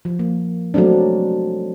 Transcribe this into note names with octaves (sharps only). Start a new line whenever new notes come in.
F3
A#3
F#3 G#3 A3 C4 D4